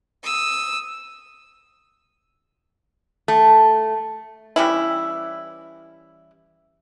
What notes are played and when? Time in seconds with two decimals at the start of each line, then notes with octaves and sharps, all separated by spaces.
0.24 D#6 E6
3.28 A3
4.56 E3 G3 C#4 E4